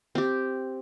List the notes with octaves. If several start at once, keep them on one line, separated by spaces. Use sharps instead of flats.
C4 G4